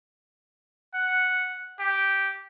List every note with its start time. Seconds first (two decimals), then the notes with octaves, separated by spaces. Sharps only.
0.94 F#5
1.79 G4